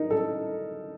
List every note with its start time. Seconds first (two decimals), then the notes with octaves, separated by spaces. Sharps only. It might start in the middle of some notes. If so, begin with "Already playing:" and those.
Already playing: D#4 A#4
0.10 A4